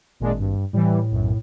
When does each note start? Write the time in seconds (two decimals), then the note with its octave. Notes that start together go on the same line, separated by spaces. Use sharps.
0.20 G#1 A#2 G#3 D4
0.39 G2
0.73 A2 E3 G3
1.10 B1 F#2